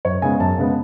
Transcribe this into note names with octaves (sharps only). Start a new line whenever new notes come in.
F#2 C#5
C#3 G#3 B3 G#5
F#2 A5
C#3 G#3 B3